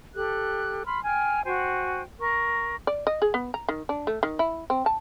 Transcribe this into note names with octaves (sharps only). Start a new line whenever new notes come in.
G4 A4 F#6
B5 C6 F6
G5 G#5 F6
F#4 C5 G5 G#5
A#4 C#6
D5
D#5
G#4
B3
A#5
D#3
D4
A3
D#3
E4
C4
A5